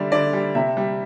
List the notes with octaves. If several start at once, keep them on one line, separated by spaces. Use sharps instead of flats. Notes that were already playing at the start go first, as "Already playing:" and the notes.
Already playing: D3 G3 D5 E5
D3 D5
G3
C3 E5
G3